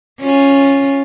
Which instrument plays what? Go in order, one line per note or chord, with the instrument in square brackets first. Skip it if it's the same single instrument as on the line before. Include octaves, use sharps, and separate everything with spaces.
[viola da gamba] C#4 F4